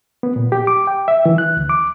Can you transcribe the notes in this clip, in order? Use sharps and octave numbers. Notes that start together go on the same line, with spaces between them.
B3
A#2
G4
D6
G5
E5
E3
F#6
D2
D6